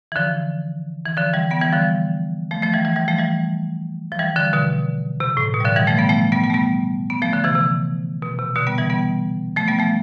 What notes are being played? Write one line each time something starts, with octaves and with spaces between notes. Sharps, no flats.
E3
D3 F3
E3
D3 F3
E3 G3
G3 B3
E3 G3
D3 F3
F3 A3
F3 A3
E3 G3
E3 G3
E3 G3
F3 A3
E3 G3
F3
E3 G3
D3 F3
B2 D3
C3
A2
B2
G3
D3 F3
E3 G3
F3 A3
G3 B3
F3 A3
G3 B3
G3 B3
A3
G3 B3
B3
F3 A3
D3 F3
C3 E3
C3
B2
C3
B2 D3
G3 B3
E3 G3
G3 B3
F3 A3
G3 B3
F3 A3